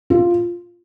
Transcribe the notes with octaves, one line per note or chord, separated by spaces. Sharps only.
F4